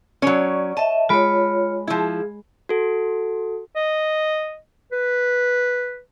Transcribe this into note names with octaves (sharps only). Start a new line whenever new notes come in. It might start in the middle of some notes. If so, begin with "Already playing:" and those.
F#3 C#4 C#5 D5
D#5 E5 A5
G#3 F4 C#5 B5 D7
F3 E4 G#4
F#4 A4
D#5
B4